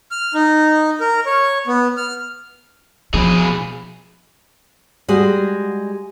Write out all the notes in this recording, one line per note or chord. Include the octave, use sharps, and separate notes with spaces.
F6
D#4
A#4
C#5
B3
F6
B2 F3 G#4
G3 G#3 F#4 G#4